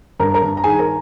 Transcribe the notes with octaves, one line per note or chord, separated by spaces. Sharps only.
G2 A#4 A#5
A#4 A#5
G2
A#5
D#3 G#4 G#5
A#4 A#5